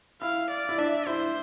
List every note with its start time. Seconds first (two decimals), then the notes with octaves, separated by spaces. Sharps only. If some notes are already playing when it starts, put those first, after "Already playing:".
0.21 E4 F5
0.50 D5
0.69 E4
0.78 D4 E5
1.07 E4 C5